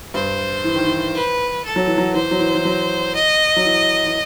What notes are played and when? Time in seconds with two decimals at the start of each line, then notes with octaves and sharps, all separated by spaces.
0.14 G2 C5
0.64 E3
0.76 D#3
0.87 E3
1.14 B4
1.65 A4
1.76 F#3
1.87 E3
1.98 F#3
2.14 E3 C5
2.31 F#3
2.39 E3
2.55 E3
2.65 F#3
3.15 D#5
3.56 F#3
3.65 E3
4.06 E3